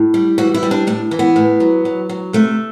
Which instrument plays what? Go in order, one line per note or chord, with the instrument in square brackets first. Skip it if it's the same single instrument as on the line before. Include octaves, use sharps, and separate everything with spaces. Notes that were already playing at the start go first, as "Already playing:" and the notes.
Already playing: [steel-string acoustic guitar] A2
G3
E3 F#4
E4
G3
D4
A2 D4
E3
B3
A2
F#3
F#3
F#3
C3 A3